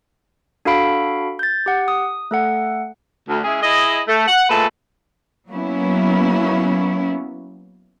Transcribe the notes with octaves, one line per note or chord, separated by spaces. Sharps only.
D4 F#4 A4 F5 B5 D7
G6 A6
G4 F#5
D#6
A3 A4 F#5
D2
G#3 C#4 E4 G#4
E4 G#4 D#5
A3
F#5
A#2 G#3 A3 A4 B4
F#3 A#3 B3 C#4 E4